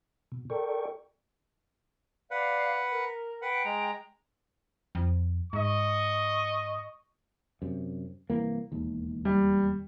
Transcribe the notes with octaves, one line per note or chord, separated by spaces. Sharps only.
B2
A4 A#4 D5 G5 C#6
B4 D5 F5 F#5
A#4
B4 F#5 G5
G#3 A#5
F2
G#2 D#5 C#6
F#2 C3
C2 E3 A#3
E1 D#2
G3